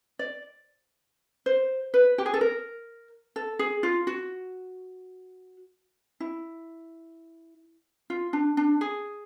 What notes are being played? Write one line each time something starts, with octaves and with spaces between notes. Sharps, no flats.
D5
C5
B4
G4
G#4
A4
A#4
A4
G#4
F4
F#4
E4
F4
D4
D4
G#4